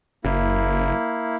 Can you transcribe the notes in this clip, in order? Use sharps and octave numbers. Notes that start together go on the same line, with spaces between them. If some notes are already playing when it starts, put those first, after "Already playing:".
F#1 A#3 E4